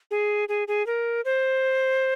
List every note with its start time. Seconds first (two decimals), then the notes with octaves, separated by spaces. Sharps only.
0.11 G#4
0.49 G#4
0.68 G#4
0.87 A#4
1.25 C5